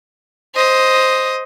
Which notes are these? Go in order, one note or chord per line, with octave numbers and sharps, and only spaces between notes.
C5 D#5